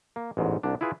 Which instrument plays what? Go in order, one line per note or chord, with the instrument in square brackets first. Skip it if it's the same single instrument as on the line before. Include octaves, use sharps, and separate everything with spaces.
[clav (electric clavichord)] A#3
A1 E2 G#2
C2 D4
E4 F4 G#4 B4